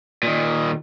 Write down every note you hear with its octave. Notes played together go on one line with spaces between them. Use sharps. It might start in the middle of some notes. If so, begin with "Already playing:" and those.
A#2 D#3